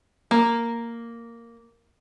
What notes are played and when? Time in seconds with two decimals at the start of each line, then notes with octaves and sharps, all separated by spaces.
0.31 A#3 A#4